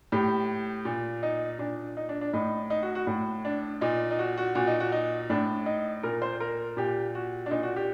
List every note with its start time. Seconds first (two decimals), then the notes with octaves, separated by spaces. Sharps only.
0.12 A2 G4
0.85 A#2
1.23 D#4
1.59 A#2 D4
1.97 D#4
2.09 D4
2.21 D4
2.33 A2 D#4
2.70 D#4
2.82 F#4
2.95 F#4
3.07 A2
3.45 D4
3.81 A#2 D#4
4.11 D#4
4.19 F#4
4.37 F#4
4.55 A#2 F#4
4.67 D#4
4.80 F#4
4.92 D#4
5.30 A2 D4
5.66 D#4
6.03 A#2 A#4
6.22 C5
6.40 A#4
6.77 A#2 G4
7.15 F#4
7.46 D4
7.51 A#2 D#4
7.63 F#4
7.76 G4